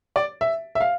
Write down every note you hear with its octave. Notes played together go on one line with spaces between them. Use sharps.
D5
E5
E5
F5